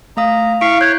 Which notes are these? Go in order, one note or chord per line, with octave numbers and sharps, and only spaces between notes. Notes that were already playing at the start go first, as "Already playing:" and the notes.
A3 F5 A#5 D#6
E4 F5 C#6 B6 D7
C#5 F#6 G6